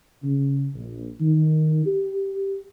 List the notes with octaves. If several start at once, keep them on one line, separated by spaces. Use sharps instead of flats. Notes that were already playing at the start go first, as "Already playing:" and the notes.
C#3
A#1
D#3
G4